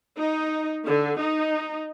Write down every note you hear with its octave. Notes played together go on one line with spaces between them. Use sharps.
D#4
D3
D#4